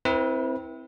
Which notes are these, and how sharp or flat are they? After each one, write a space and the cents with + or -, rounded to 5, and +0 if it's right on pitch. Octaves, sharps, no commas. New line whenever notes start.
C4 +0 E4 -10 B4 -40